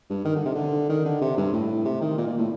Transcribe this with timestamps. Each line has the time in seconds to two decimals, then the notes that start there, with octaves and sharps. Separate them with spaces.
0.10 G2
0.25 D#3
0.36 D3
0.45 C3
0.55 D3
0.89 D#3
1.05 D3
1.21 C3
1.37 G2
1.53 A2
1.85 C3
2.01 D#3
2.17 A#2
2.28 A#2
2.38 A2